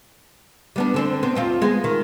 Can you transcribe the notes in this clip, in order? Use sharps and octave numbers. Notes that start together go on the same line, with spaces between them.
G3 B3 D4
D3 C4 D4
B3 C4
D#2 C4 F4
G#3 B3
D#3